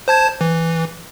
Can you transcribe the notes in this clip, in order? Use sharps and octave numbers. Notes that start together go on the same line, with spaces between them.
C5 A5 G#6
E3